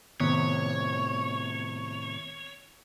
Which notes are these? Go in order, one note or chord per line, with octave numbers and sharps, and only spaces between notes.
A2 C3 D#3 B3 C#5